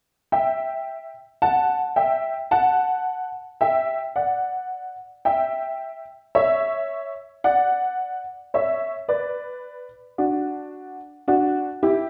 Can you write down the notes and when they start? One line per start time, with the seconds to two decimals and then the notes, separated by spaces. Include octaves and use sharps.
0.32 E5 G5
1.42 F#5 A5
1.96 E5 G5
2.51 F#5 A5
3.61 E5 G5
4.16 D5 F#5
5.25 E5 G5
6.35 C#5 E5
7.44 D5 F#5
8.54 C#5 E5
9.09 B4 D5
10.18 D4 F#4
11.28 D4 F#4
11.83 E4 G4